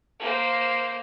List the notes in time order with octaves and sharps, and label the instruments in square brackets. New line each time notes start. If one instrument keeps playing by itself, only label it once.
[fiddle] A#3 C5